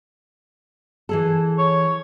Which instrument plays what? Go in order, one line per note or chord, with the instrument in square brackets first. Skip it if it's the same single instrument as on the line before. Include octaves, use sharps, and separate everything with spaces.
[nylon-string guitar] E3 G#4 A4
[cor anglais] C#5